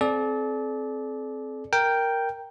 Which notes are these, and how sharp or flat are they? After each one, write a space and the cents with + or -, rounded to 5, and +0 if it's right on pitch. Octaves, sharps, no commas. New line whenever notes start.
C4 +0 A4 -45 D5 +0
A#4 +0 G5 +0